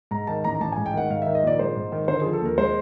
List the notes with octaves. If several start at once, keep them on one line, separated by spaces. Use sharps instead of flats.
G#2 A#5
D#3 A5
A1 A#5
A#5
A1 A5
G#2 G#5
G5
D#3 F#5
G#2 F5
D#3 E5
D#5
A#1 D5
G#3 C5
G#2
D#3
D3 C5
F3 G#4
A4
D#2 A#4
G#3 C5